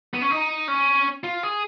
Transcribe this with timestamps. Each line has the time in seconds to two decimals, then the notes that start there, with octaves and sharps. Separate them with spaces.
0.14 B3
0.21 C#4
0.31 D#4
0.68 C#4
1.24 F4
1.43 G#4